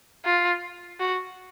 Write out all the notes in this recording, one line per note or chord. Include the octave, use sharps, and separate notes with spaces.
F4
F#4